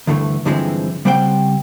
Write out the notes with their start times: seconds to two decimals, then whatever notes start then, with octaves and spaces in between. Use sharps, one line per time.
0.07 D2 G2 D3 E3 A3
0.45 G2 D3 E3 F3 G#3 C4
1.05 C#3 G3 C4 C5 F#5 G5